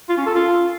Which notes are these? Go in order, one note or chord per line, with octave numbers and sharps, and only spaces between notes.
F4
C#4
A4
F4